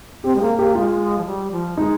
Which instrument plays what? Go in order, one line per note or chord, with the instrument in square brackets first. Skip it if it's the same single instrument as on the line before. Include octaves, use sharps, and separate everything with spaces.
[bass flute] C4 [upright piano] G4
[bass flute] G#3
[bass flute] A#3 [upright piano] G#4
[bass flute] A#3 [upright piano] G4
[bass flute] G#3 [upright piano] F4
[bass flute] F3
G3
F3
[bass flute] G#3 [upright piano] D#4